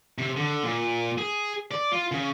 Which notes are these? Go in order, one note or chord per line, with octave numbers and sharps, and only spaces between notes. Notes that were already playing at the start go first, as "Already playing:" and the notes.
C3
D3
A#2
G#4
D5
F4
C#3